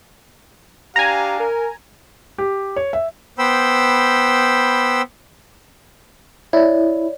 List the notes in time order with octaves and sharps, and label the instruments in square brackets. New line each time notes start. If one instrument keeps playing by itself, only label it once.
[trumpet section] D4 F5 [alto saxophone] G4 [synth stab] G#5 A#5
[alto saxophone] A#4
[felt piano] G4
C#5
E5
[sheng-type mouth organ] B3 C5 G5 B5 E6
[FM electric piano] E4 [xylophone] C#5 D5